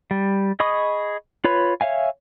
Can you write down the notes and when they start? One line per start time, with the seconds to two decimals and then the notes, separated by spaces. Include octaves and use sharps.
0.11 G3
0.60 G#4 D#5 B5 C#6 D#6
1.44 F4 B4 C#5 B5
1.81 C#5 E5 F5 G#5